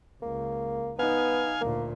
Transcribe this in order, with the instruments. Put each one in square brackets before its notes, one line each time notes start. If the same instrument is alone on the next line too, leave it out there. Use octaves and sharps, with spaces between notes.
[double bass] C#2 [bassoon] A#3
[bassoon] B3 [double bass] D#4 [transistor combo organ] F5 G#5
[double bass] D2 A#2 [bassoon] A#3